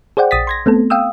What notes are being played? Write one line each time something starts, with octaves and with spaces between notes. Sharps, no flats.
G#4 C5 D5 F#5 G5
A#1 D#6 A6 B6
C6 G#6 A#6
A3 B3 C4 A4
F5 G5 D#6 E6